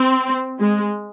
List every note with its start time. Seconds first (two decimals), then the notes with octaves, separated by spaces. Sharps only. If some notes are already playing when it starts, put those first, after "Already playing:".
Already playing: C4
0.59 G#3